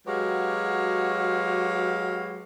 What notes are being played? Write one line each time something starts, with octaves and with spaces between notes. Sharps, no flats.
F#3 G#3 F#4 G4 B4 F5